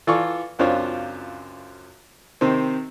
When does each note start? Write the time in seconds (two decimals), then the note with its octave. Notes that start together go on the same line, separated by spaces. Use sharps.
0.07 E3 F4 A4 D5 C#6
0.59 C#2 F#2 C4 D4 F4 C#5
2.41 C3 D#3 C4